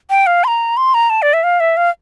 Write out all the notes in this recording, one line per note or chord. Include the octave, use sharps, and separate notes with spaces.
G5
F5
C6
A#5
C6
A#5
A5
D5
E5
F5
E5
F5